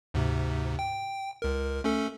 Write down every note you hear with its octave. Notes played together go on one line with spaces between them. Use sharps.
D2 G#2 C3
G5
C#2 A#4
A3 C#4 A4